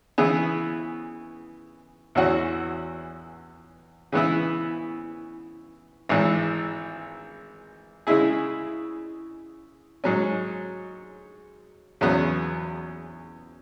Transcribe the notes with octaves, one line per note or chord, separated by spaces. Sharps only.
C#3 E3 B3 E4 G#4
E2 E3 C#4 F#4
C#3 E3 B3 E4
G#1 G#2 E3
C#3 G#3 E4 G#4
G#2 F#3 C#4
E2 C#3 F#3 B3